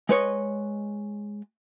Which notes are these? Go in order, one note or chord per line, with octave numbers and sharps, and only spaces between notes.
G#3 B4 C#5 D#5